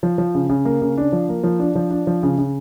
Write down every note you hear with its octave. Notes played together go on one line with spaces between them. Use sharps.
F3
F3
C#3
C#3
A#3
C#3
D4
F3
A#3
F3
D4
F3
D4
F3
C#3
C#3